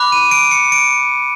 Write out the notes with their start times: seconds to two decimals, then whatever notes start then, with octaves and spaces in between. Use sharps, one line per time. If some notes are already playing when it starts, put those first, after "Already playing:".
Already playing: B5 D6 F#6
0.12 D#7
0.31 D7
0.51 C#7
0.72 D7